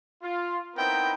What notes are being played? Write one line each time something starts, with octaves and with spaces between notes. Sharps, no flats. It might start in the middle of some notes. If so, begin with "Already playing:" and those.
F4
B3 C4 D#4 E4 A#4 G5